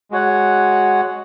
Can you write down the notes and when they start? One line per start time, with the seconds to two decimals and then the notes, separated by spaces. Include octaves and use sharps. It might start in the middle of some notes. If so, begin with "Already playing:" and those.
0.11 G#3 F#4 C#5 F#5